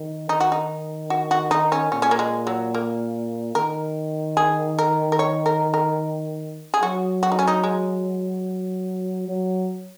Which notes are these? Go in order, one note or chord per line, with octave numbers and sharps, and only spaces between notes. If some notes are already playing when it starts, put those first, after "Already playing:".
Already playing: D#3
D#3 D#4
F#4
D#4
F#4
F#4
D#4
C#4
A#2 C#4
C#4
A#3
G#3
F#3
A#3
D#3 A#4
G#4
A#4
A#4
C#5
A#4
A#4
G#4
F#3 F#4
F#4
D#4
C#4
D#4
G#3
F#3